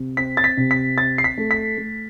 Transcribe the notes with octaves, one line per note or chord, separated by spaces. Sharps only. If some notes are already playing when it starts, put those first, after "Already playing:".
Already playing: C3
C4 B6
A6
B6
C3
B6
C4 A6
C7
B6
A3
B6
A3